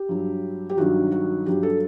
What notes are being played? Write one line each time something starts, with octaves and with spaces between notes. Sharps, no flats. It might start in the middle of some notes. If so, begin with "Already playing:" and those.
Already playing: G4
G2 F#3
G4
G2 D#3 F#3 F#4
F#4
G2 F#3 G4
A4